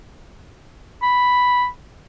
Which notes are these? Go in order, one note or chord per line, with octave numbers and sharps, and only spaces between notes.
B5